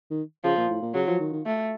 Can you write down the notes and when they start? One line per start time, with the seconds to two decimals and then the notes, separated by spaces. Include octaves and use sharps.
0.11 D#3
0.44 C#3 F3
0.57 A#2
0.70 A2
0.82 A#2
0.95 C#3 F#3
1.08 F3
1.20 D#3
1.33 D#3
1.46 A3